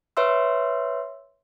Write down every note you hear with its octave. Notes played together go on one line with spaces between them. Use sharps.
B4 C#5 E5 C6 E6